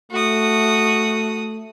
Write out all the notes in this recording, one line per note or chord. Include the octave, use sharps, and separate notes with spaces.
A3 F#4 D#6